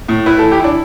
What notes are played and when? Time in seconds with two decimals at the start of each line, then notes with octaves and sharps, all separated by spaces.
0.08 A2
0.26 E4 B4
0.39 A4
0.43 E3
0.52 G4
0.60 D4 E4